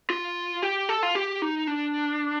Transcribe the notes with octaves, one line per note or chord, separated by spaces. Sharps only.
F4
G4
A4
F4
G4
D#4
D4